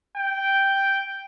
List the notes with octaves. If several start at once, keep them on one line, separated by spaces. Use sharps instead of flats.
G5